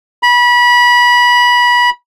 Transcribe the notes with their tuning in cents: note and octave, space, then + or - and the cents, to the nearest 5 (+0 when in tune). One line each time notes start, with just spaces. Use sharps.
B5 -25